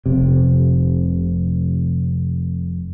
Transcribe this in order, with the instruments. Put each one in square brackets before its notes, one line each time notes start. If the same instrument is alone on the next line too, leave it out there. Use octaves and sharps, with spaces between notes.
[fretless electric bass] F1 C3